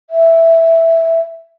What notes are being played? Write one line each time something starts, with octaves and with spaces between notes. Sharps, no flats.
E5